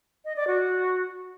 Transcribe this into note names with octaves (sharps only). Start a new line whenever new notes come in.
D#5
D5
F#4